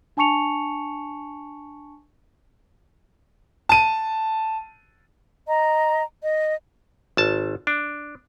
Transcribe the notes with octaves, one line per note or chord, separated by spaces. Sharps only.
D4 G#5 A5 C#6 C#7 F7
A5 D#7
D#5 A#5
D#5
G#1 A5
D4